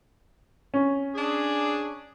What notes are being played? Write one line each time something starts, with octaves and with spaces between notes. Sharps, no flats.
C#4
D4 G#4